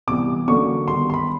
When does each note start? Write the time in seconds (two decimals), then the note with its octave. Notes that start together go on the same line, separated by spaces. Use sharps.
0.07 C3 E3 G3 B3 D6
0.48 D3 F#3 A#3 C#4 C#6
0.88 D#3 G3 B3 C6
1.10 C6
1.14 B5